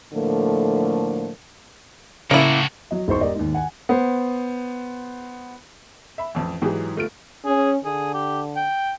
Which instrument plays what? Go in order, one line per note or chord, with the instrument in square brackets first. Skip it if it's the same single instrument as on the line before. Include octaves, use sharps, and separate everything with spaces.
[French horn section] A2 D3 F3 A3 A#3
[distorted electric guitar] A2 F#4 [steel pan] C#3 [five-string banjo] A#3 E4
[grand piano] F#3 D#5
E1 G#2 C5 C#6
G4 A#4 D5 D#5
D#2 G#2
F#5 G#5
[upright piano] B3 C5
E5 B5
A1 F2
G#2 E3 F#3 G4 G#4
G1 A3 F4 D7
[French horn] C#4 [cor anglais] G#4
[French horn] D3 [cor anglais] G#4
[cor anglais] G4
G5